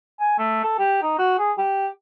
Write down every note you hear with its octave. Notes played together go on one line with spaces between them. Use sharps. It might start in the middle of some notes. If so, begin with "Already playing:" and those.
G#5
A3
A4
G4
D#4
F#4
G#4
G4